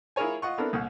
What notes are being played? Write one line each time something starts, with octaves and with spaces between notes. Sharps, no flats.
E4 F4 G#4 A#4 C#5 G#5
F4 D#5 F#5 C#6
B3 C4 D4 E4 A4 A#4
C2 A#2 F#5